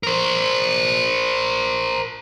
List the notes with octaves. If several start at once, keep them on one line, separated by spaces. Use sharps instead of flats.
A#4 C5